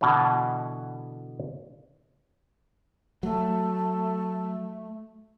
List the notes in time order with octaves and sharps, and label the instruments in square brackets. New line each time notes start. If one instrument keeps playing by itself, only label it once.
[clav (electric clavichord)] B2 D3 E3
[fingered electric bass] F#3 [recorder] A3